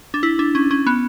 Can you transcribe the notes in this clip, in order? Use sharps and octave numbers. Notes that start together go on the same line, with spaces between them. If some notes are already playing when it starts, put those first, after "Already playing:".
D4
E4
D4
C#4
C#4
B3